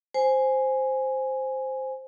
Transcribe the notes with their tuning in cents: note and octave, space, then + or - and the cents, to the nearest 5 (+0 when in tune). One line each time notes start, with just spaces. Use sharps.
C5 +0 G#5 +0